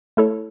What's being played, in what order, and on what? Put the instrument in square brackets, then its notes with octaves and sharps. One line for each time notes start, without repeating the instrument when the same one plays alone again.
[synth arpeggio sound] A3 E4 A4 C#5